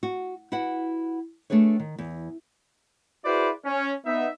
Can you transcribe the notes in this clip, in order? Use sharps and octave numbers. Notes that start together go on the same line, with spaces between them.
F#4
E4 F#4 B4 F#5
A3 D4 G#4 B4 C#5
D#3
E2
E4 F#4 G#4 B4 C5 D5
C#4
B3 D#4 E5